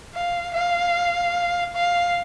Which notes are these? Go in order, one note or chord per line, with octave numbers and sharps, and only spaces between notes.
F5
F5
F5